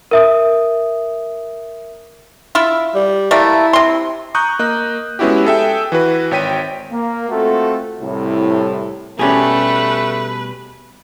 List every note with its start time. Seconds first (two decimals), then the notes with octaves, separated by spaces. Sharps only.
0.11 A#4 E5 D#6
2.55 E4 F4 E5
2.95 G3
3.31 G3 A3 A#3 E4
3.73 C3 C6
4.35 A#5 C#6 D#6 F#6 G6
4.59 A#3 D#5 F#6
5.19 G#3 B3 C#4 E4 F#4 G4
5.45 G#4 A4 E5 G5
5.92 E3 F#4 B4
6.31 G#1 C#5 G5 B6 D#7
6.91 A#3
7.29 A3 C4 F4 F#4 A4
8.01 C2 A2
9.19 B2 G3 A3 C#4 G4 G#4 B4